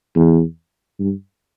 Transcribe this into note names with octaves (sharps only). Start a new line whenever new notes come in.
E2
G2